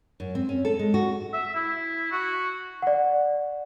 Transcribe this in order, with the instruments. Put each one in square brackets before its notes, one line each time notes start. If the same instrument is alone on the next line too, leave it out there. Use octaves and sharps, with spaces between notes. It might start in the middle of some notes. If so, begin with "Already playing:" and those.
[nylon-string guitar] F#2
C4
C#4
A4
G#3
F#4
[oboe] E5
E4
F#4
[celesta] D5 F#5